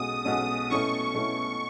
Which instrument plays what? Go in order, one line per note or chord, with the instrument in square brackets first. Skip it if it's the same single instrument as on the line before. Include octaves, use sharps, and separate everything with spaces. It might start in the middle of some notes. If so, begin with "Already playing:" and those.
Already playing: [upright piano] B1 B2 G#3 C#4 F#4 [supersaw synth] D#6
[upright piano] B1 B2 G#3 C#4 F#4 [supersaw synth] D#6
[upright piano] B2 A3 C#4 E4 [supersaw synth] C#6
[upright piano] B2 A3 C#4 E4